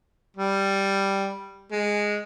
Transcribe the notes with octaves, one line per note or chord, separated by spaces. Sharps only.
G3
G#3